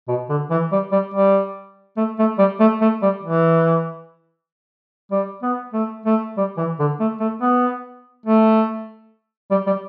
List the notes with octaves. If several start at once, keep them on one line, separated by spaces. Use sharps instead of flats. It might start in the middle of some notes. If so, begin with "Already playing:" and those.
B2
D3
E3
G3
G3
G3
A3
A3
G3
A3
A3
G3
E3
G3
B3
A3
A3
G3
E3
D3
A3
A3
B3
A3
G3
G3